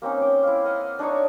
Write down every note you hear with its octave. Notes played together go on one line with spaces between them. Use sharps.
A#3 C4 C#4 D#4
G5 D6
E4 F5
D#5 F5 F#5
D4 D#4 C#5 D5